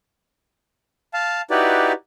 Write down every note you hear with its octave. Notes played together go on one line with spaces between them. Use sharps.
F5 A5
D#4 E4 F#4 G4 B4 D5